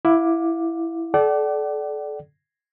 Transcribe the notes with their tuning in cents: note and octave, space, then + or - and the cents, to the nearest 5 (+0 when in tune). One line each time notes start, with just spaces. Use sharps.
E4 +5 F5 +35 D6 +5
A4 -35 D5 +0 F#5 +45